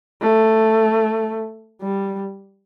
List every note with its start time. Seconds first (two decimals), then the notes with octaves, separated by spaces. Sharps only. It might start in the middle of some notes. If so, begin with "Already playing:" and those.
0.22 A3
1.81 G3